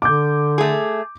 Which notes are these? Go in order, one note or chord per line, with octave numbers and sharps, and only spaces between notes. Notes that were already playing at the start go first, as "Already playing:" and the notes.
D3 D6 G6
A3 G#4